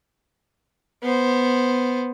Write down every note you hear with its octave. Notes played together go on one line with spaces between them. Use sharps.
B3 C5